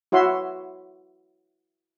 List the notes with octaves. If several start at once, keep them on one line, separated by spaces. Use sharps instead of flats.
E4 F#4 C#5 E5 C6